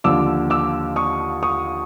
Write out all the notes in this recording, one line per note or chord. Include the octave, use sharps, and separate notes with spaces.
D#2 D3 F3 D6 E6
D6 E6
C#6 D#6
C#6 D#6